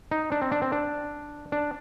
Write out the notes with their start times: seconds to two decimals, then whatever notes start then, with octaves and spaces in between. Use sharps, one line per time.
0.11 D#4
0.32 D4
0.42 C4
0.52 D4
0.62 C4
0.72 D4
1.52 D4